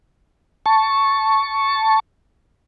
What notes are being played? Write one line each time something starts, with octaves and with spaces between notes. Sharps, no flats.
A5 C#6